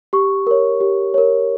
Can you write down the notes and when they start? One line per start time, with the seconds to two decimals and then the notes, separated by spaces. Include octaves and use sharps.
0.13 G4 C#6
0.47 A#4 C#5
0.81 G4
1.14 A#4 C#5